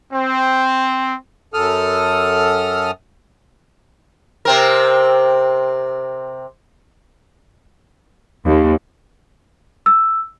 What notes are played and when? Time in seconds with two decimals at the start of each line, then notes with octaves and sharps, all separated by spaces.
0.13 C4
1.54 F#2 A4 D#6 F6
4.45 C3 C4 A#4
8.46 D#2
9.86 E6